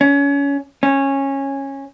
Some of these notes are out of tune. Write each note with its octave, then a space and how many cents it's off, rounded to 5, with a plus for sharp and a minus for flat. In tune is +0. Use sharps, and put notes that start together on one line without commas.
C#4 +25
C#4 -15